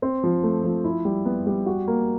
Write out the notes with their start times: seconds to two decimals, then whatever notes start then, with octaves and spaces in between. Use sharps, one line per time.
0.02 C4
0.24 F3
0.43 A3
0.64 F3
0.84 E4
1.05 G3
1.26 B3
1.47 G3
1.66 F#4
1.87 A#3